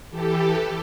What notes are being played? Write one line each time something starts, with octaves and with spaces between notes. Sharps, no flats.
E3 G4 A4